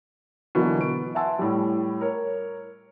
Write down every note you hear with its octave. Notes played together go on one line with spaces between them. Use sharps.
B2 D3 E3 F#3 A#3
B3 D7
E5 F#5 G#5 A5 C6 E6
A2 G3
A#4 C#5